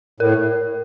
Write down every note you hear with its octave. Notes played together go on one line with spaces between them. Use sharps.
A2 A#4